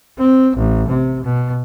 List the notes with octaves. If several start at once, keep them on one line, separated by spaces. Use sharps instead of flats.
C4
A1
C3
B2